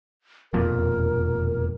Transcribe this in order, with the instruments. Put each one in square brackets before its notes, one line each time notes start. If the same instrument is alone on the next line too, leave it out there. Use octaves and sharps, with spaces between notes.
[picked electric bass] E1 F2 A#2 [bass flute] A#4